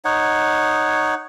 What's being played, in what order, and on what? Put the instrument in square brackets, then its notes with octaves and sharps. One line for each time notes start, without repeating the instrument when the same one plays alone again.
[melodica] D#4 C#5 F#5